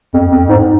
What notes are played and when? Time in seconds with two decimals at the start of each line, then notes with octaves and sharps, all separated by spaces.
0.14 F2
0.32 F2
0.49 G#2